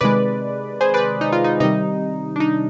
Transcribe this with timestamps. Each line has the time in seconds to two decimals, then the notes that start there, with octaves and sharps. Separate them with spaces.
0.01 C3 D#3 G#3 B4 D5
0.81 G#4 C5
0.94 B4 D5
1.21 D#4
1.32 F4
1.44 D#4
1.60 C3 D#3 G3 D#4
2.36 D4
2.40 D#4